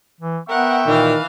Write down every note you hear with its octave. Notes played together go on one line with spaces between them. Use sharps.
E3
B3 A#4 E5 F#5 G5 C#6
A#2 D#3 E3 F5